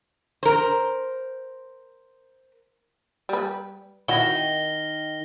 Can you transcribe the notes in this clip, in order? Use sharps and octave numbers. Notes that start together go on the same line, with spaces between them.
A#4 C5
G3 B4
D#3 E4 F#4 A#6 G7